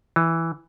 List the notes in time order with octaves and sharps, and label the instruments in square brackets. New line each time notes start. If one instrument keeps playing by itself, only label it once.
[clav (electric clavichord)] E3